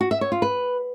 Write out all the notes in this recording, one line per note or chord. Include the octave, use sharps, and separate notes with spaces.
F#4
E5
C#5
F4
B4